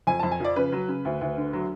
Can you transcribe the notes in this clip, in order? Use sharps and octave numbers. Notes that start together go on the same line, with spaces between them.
F2 G#5
F2 A5
G#5
F3 D5
C#3 B4
F#3
C#3
D2
D2
D3
F#3